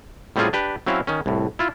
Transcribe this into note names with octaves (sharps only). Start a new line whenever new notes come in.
A2 G3 C4 C#4 F4 G#4
D4 G4 B4
F#3 C4 C#4 E4 F5
D#3 C#4
C2 A2
E4 F4